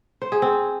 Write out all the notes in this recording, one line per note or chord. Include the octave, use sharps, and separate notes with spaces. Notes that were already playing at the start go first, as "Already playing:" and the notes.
C5
G#4
C4